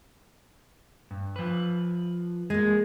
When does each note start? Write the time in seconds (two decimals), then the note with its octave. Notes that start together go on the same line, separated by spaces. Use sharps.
1.11 G2
1.36 F3 B4
2.50 G#3 A#3 G#4